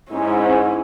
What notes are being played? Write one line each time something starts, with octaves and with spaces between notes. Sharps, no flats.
G#2 C#4 E4